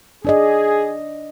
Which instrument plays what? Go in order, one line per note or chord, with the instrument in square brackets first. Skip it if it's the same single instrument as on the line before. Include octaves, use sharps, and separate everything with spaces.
[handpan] D4 D5 D#5 [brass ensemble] G#4